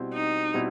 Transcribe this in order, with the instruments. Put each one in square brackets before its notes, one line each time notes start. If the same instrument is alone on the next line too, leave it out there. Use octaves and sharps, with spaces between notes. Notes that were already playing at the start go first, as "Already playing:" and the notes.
Already playing: [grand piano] B2 G3 C4 E4
[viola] D#4
[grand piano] B2 G3 C4 E4